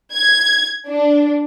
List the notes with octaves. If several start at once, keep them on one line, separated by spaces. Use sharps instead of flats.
G#6
D4